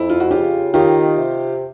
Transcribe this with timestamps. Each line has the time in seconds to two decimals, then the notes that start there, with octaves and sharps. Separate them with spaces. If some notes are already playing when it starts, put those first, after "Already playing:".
Already playing: F2 E4
0.10 F4
0.20 F#4
0.31 C#3 F4 G4
0.74 D#3 F4 G4
1.17 C3